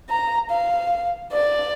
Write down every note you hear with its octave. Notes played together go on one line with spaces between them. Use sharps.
A#5
F5
D5